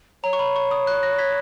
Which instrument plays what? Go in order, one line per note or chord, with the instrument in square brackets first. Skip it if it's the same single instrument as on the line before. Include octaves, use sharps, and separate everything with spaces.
[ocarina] C#5 [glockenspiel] A#5
[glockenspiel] C#6
B5
C#6
D#6
F#6
F#6 A#6
G#6 B6